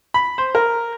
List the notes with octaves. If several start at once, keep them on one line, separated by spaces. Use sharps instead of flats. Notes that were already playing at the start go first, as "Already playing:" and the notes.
B5
C5
A#4